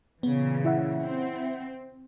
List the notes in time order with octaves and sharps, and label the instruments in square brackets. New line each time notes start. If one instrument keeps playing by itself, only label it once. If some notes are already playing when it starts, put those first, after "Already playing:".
[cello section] A#2 C#3 E3 [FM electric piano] B3
[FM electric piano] E4 E5 F#5
[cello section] C4